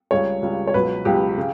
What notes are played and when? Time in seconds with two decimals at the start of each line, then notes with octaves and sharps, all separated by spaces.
0.11 C#2 C#3 G3 C#5
0.43 C#2 C#3 G3
0.67 C#5
0.74 C#2 B2 F#3 B4
1.05 C#2 B2 F#3 G4
1.38 C#3